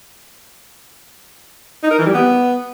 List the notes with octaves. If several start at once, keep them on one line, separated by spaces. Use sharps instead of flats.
D#4
A#4
E3
G3
B3